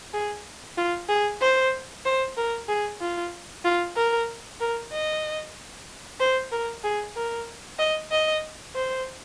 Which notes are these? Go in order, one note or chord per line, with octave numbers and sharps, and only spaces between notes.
G#4
F4
G#4
C5
C5
A#4
G#4
F4
F4
A#4
A#4
D#5
C5
A#4
G#4
A#4
D#5
D#5
C5